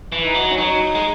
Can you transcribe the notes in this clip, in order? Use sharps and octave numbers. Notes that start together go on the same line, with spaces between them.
E3
D#4
F#3
C#4
F#3 D#4
G#3